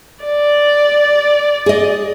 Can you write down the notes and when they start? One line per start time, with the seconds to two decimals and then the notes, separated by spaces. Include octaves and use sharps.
0.24 D5
1.66 G#4 D#5